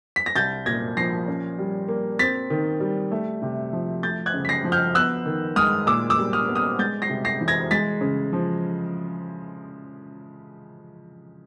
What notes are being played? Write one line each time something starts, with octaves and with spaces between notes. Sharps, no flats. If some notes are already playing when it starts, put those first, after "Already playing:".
B6
A#6
C2 G6 A6
A#2 G#6 A#6
F3 A#6 C7
C#4
G3
A#3
C4 A6 B6
D#3
G3
A3
C3
F3
A3 G6 A6
F#6 G#6
C#3
B6
A#6 C7
F3
F6 G6
B3 E6 F#6
D#3
G#3 D#6 F6
A#2 D6 E6
D6 E6
G3
D#6 F6
B3
D#6 F6
G#3 G6 A6
A#6 C7
C3
A#6 C7
E3
G#6 A#6
G#3 A6 B6
C#3
F3